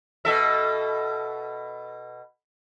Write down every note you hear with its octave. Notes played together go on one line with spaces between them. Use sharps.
B2 A4 E5